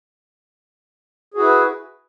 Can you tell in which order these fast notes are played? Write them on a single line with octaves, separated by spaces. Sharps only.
G#4 F#4 E4 B4